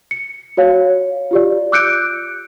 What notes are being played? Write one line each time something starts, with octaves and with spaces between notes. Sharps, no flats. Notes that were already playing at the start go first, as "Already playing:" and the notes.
C#7
F#4 C#5 F5
F4 G4 D5
D6 E6 F#6 G6 C#7 D7